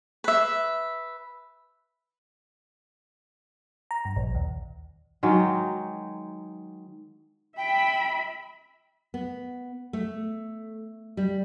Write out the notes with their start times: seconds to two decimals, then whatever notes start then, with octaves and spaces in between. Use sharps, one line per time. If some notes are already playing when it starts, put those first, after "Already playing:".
0.24 B4 E5
3.91 A#5
4.05 G2
4.16 A#1
4.35 D#2
5.23 D#3 F#3 G#3 D#4
7.57 E5 G5 B5
9.14 B3
9.93 A3
11.17 G3